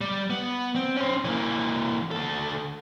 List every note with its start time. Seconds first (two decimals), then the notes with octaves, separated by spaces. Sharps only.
0.01 G3
0.30 B3
0.75 C4
0.97 C#4 C5
1.25 E3 A#3
2.11 D2 A4